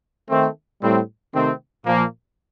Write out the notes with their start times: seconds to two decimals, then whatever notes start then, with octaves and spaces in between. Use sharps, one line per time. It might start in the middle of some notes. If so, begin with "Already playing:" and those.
0.29 D#3 A3 C4
0.81 A2 G3 C4
1.33 C3 D#3 A3 C4
1.85 A#2 F3 A#3